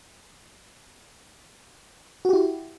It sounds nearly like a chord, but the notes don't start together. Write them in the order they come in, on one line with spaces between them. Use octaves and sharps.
F#4 G4 E4